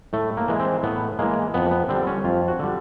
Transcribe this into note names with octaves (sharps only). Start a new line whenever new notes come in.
A2 A3
A#3
E3 G#3
C4
A2 B3
E3 G#3 A#3
F2 B3
B3
D3 G3 C4
C#4
F2 F4
F#4
D3 G3